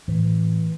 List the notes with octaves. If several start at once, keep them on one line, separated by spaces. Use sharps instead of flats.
A2 E3